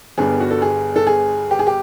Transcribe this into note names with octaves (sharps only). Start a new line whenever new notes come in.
G1 G2 D3 G3 B3 G#4
F#4
A4
G#4
A4
G#4
G4
G#4
G4